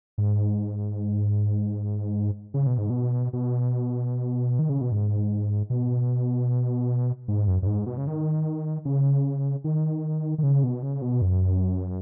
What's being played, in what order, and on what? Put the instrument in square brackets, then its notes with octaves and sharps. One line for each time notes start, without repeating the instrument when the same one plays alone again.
[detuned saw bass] G#2
C#3
B2
G#2
B2
B2
D#3
C#3
B2
G#2
B2
G#2
F#2
F#2
G#2
B2
C#3
D#3
C#3
D#3
D#3
C#3
B2
C#3
B2
F#2